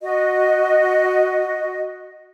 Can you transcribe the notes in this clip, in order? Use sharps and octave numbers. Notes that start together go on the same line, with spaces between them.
F#4 D#5